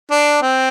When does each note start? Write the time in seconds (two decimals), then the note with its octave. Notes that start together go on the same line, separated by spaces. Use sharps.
0.11 D4
0.42 C4